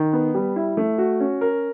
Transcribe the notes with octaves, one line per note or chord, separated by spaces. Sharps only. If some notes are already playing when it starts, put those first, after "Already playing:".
Already playing: D#3
B3
G3
E4
A3
F#4
C#4
A#4